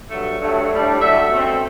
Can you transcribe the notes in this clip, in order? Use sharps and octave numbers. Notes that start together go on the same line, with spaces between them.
G2 F#3 A3
G2 F#3 A3
A2 G3 D4
D3 F#3 A3 E5
B2 A3 C4